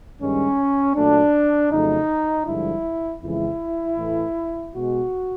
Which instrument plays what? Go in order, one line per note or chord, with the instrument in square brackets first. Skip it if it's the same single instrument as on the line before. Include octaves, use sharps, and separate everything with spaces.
[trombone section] G2 D#3 G#3 C#4
A#2 F#3 A3 D4
F2 C#3 F#3 A3 D#4
G2 D3 F3 G#3 E4
F2 C#3 E3 G#3 E4
A2 E3 A3
B2 G#3 F#4